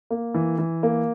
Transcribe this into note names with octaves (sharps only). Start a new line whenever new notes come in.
A#3
E3
E3
A#3